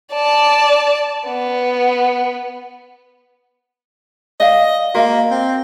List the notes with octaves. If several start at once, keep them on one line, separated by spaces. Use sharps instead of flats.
D5 A5
B3
D5 D#5 F5
A#3 F#4 D#5 F5
C4